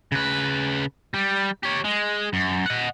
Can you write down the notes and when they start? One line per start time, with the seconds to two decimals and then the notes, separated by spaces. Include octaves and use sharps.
0.12 C#3 B4
1.14 G3
1.63 G4 C#5
1.85 G#3
2.33 F#2
2.66 D#5 F#5